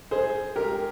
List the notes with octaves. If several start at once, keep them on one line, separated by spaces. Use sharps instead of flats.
G#4 C5
G4 A#4